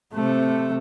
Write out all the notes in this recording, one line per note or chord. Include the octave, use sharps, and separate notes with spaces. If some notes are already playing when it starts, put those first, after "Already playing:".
C3 A3